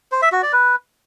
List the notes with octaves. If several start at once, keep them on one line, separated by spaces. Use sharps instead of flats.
C5
E5
F#4
D5
B4